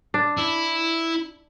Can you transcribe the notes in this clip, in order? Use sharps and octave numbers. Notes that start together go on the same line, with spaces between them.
D4
E4